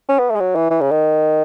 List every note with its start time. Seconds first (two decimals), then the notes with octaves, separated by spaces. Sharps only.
0.09 C#4
0.19 B3
0.30 A3
0.35 G#3
0.40 F#3
0.55 E3
0.70 E3
0.81 C#3
0.91 D#3